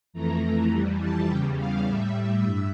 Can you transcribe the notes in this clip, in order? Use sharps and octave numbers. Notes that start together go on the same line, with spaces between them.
F2 E3 A3 A#5
F2 E3 G3
A5
E2 C#3 G3 G5
F5
A2 G3 E5
G2 E5